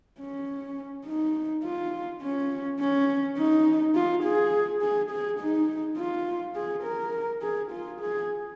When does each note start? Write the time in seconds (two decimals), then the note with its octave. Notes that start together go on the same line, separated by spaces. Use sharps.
0.20 C#4
1.06 D#4
1.64 F4
2.22 C#4
2.80 C#4
3.38 D#4
3.95 F4
4.24 G#4
4.82 G#4
5.11 G#4
5.40 D#4
5.97 F4
6.56 G#4
6.84 A#4
7.42 G#4
7.72 F4
8.00 G#4